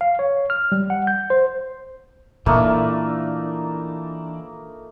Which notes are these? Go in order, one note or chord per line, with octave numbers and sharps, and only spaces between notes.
F5
C#5
F6
G3
F#5
G6
C5
A#2 E3 A3 A#3 D4 D#4